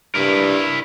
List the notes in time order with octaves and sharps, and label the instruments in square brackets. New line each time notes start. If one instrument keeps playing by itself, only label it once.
[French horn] G2 [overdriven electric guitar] E4 A#4